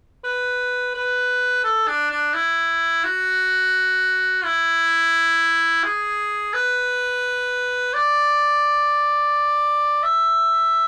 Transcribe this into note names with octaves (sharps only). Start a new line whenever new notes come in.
B4
B4
A4
D4
D4
E4
F#4
E4
G#4
B4
D5
E5